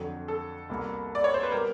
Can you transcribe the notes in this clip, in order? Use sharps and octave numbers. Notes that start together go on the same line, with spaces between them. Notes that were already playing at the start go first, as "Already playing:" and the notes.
Already playing: F2 D3 F#3
A4
C2 B2 G3 A#3
D5
C#5
C5
B4
B2 G3 C4 A#4